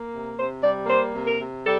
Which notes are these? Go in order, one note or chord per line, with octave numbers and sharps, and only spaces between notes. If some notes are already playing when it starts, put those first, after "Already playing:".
Already playing: A#3
C3
C3 C5
G3 D5
A#3 C5
C3
A#4
C3
G3 A4